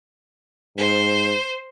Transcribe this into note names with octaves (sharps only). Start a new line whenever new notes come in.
G#2 C5